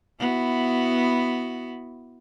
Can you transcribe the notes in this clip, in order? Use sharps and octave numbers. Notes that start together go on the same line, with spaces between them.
B3 E4 F#4